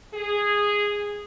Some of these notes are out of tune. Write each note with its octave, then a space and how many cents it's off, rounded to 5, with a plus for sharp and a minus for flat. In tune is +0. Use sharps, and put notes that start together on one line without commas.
G#4 -10